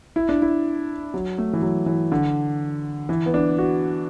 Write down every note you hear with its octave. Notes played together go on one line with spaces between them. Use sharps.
E4
D4
E4
F#3
A3
E3
F#3
E3
D3
E3
B3
D4
F#4